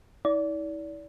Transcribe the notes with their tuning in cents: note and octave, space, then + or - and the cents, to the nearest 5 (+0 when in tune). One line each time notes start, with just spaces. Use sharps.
E4 -45 D5 -30